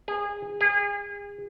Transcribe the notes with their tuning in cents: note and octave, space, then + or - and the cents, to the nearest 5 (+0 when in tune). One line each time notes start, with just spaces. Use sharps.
G#4 -25
G#4 -35